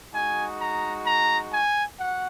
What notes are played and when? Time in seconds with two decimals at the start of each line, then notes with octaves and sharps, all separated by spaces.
0.13 G#3 D#4 F#4 G#5
0.60 A#5
1.06 A#5
1.51 G#5
1.97 F#4 F#5